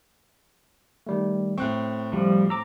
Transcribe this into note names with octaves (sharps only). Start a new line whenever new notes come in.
D#3 G3 A3
A2 C4 C#6 F#6
F3 G3
A#5 D6 E6